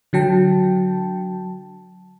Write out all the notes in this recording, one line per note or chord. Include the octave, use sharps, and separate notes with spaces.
D3 F#3 G5 A5